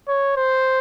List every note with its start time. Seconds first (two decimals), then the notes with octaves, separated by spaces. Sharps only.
0.08 C#5
0.37 C5